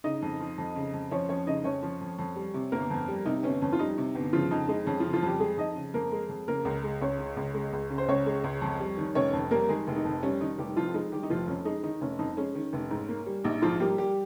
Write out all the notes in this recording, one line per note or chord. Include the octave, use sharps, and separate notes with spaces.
C#3 D#4 D#5
F2
F3
F2
C#3
F2
F3 C#4 C#5
F2 C#4 C#5
C#3 D#4 D#5
F2 C#4 C#5
F3
F2
F2
G3
C3
G1 A#3 A#4
F2
G3
C3 D#4
G1 C#4
F2 C#4
F4
G3 D#4
C3
G1
C#3 F3 F4
F2 D#4
G#3 D#4
F2 C#4
C#3 F3 F4
F3 F4
F2 G3 G4
G#3 G#4
F2 D#4 D#5
C#3
F2 A#3 A#4
G#3
F2
C#3 A#3 A#4
C#2
G#3
C#2 C#4 C#5
C#3
C#2
G#3
C#2
C#3
C5
C#2 C#4 C#5
G#3
C#2
F2
G3
D#3
F1 C#4 C#5
F2
G3 A#3 A#4
D#3 G#3 G#4
F1
D#4
F2
G3 C#4
D#3 D#4
F1 G3 G4
F2 F3 F4
G#3 D#4
D#3 G3 G4
D#4
F1 F3 F4
F2 C#4
G#3 D#4
D#3 D#4
F1 C#4
F2 D#4
G#3 C#4
D#3
F1
G#2
A#3
G3
A#1 D#4
G#2 F3 F4
G3 A#3 G4
G3 G4